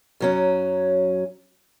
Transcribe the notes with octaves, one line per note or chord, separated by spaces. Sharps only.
F#2 F#3 C#4